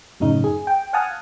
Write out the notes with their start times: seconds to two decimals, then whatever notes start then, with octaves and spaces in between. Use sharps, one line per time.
0.20 F#2 A2 C#3 D#4
0.44 G#4
0.67 G5
0.93 F5 F#5 G#5 A5 D#6 F6